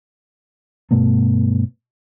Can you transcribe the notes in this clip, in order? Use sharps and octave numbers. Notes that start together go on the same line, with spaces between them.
G2 B2 A3 B3